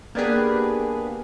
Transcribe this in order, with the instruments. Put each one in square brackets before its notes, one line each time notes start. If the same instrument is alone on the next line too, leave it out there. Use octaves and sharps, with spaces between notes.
[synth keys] A#3 B3 D4 G4 G#4 B4